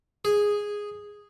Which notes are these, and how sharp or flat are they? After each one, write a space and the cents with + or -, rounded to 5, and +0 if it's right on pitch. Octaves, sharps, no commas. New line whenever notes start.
G#4 -5